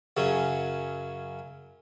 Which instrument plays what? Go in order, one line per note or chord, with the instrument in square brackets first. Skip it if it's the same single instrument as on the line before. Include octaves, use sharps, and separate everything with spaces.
[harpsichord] F#2 C#3 F#3 C#4